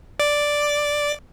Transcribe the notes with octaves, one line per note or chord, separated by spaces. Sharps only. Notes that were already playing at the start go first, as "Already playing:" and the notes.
D5 D6